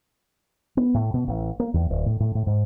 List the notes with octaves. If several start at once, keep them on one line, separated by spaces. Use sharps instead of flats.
B3
A2
B2
A1
A#3
E2
D1
A2
A2
A2
G#2